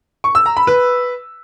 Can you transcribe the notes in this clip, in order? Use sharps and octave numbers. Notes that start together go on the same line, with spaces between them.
C#6
E6
A#5
B5
B4